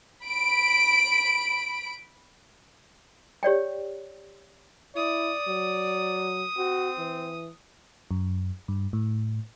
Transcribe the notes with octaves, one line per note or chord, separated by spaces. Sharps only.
B5 D7
G4 C#5 D5 G5
E4 D5 D#6
F#3
C4 F#4
E3
F#2
G2
A2